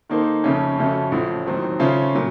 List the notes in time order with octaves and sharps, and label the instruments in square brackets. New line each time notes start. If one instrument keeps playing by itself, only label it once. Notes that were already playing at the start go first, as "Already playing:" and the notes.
[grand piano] D#3 A#3 D#4 A4 C5
F2 C#3 A3 C#4
F2 C#3 A3 C#4 F#4
A1 A2 F3
D#2 D#3 F#3 C4
C#3 A3 C#4 F4 C5
A#2 F#3